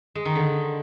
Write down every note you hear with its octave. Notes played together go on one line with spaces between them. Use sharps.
G#3
D#3
D3